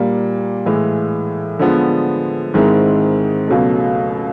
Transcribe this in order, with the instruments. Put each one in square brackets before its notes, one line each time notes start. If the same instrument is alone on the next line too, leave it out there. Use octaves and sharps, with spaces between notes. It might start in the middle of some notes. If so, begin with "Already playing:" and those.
Already playing: [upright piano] A#2 G3 A#3 D4
A2 E3 G#3
D3 F3 G#3 B3
G#2 D#3 G#3 C4 E4
C#2 B2 F#3 A3